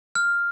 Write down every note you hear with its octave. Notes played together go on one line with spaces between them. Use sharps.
F6